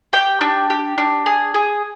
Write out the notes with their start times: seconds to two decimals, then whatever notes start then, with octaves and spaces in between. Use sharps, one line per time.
0.13 G4 G5
0.41 D4
0.70 G4
0.98 D4
1.26 G#4
1.54 G#4